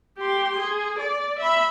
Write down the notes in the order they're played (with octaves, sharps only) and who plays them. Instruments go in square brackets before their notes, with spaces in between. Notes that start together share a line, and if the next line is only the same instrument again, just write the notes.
[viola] G4 C6
G#4
D5
E5 B5